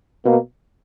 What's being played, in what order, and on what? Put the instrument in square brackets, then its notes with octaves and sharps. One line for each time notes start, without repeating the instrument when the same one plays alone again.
[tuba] B2 [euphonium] A#3